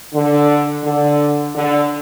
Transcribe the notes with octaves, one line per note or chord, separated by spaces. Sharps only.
D3
D3
D3